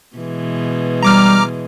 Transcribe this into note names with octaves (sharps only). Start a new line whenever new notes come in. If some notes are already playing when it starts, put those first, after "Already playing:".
B2 E3 G#3
G3 A#5 D6 F6